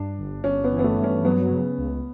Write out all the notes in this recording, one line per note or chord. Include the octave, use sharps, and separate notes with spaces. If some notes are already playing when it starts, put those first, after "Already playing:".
Already playing: G2 D4
G1
G1 C#4
B3
E3
B3
A3
G2
C#4
F#3 B3
C#3
C#2